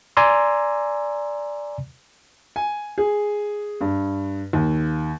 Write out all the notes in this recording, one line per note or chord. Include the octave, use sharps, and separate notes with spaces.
D5 G#5 A#5 C6 E6
G#5
G#4
G2
D#2